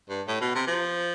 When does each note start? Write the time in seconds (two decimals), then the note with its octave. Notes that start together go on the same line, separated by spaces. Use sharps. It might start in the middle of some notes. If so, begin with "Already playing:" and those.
0.09 G2
0.27 A2
0.41 B2
0.55 C3
0.67 F3